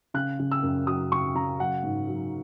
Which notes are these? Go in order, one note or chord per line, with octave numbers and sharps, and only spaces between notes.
C#3 F#6
C#3
E6
F#2
F#3 D#6
C#3 C#6
C#3 A#5
F#3 F#5
G#2
F#3